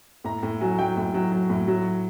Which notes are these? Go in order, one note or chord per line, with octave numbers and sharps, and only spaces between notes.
A2 A#5
A2
F#3 G#5
F#3 G5
A2
F#3
F#3
A2
F#3